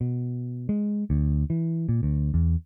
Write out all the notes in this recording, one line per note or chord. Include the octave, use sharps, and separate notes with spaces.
B2
G#3
D2
E3
A#2
D2
E2